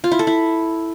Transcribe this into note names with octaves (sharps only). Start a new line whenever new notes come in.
F4
E4
A4
E4